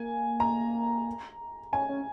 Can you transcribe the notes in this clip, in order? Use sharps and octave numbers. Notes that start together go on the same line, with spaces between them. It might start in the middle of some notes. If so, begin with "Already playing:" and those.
Already playing: A#3 G#5
A#5
C#4 G#5
C#4